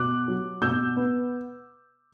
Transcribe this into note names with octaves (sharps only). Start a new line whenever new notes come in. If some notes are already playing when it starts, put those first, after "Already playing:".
Already playing: B2 D6 F#6
F#3
B2 E6 G6
B3